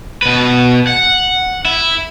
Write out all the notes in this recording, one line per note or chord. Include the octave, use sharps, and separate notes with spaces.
B2 B4
F#5
E4